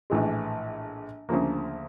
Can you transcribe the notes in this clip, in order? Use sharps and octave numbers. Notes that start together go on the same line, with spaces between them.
A#1 A2 E3 G#3
D2 C#3 F3 A#3